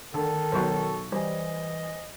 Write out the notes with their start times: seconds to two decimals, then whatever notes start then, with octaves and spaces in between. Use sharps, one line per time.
0.14 D3 D#3 A4
0.52 B1 F#3 B4 C5 C#6
1.12 E3 G3 C5 D#5 G#5